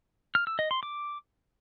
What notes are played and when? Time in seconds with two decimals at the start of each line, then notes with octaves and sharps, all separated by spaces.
0.35 F6
0.47 E6
0.59 D#5
0.71 C6
0.83 D6